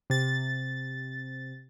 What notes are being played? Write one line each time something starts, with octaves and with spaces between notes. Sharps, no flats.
C3 A6